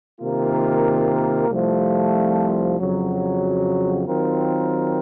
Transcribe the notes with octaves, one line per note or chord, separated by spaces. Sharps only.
C3 D#3 A#3 F4 A#4
C2 C3 F3 A3
F2 C#3 F#3
D#3 F#3 C4 F4 A#4